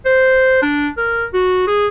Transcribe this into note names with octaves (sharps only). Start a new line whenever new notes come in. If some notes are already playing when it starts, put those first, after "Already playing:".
C5
D4
A#4
F#4
G#4